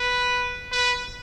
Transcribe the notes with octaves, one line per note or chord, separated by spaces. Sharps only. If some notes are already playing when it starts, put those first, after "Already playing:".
Already playing: B4
B4